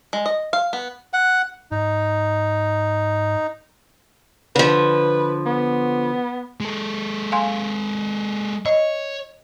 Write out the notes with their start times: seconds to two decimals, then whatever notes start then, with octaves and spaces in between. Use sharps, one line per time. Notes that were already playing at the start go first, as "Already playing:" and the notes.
0.13 G#3
0.26 D#5
0.53 F5
0.73 B3
1.13 F#5
1.72 G#2 D#4
4.56 D3 F3 B4
5.46 B3
6.61 G#3 A4
7.32 F5 G#5 C6
8.66 C#5 D#5